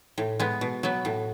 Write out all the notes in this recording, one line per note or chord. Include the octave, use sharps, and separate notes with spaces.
A2
G#3 B3
B2
F#3 B3
A2